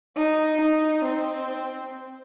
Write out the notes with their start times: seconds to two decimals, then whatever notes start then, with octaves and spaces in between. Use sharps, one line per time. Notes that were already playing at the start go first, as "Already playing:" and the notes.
0.16 D#4
0.61 D#4
1.06 C4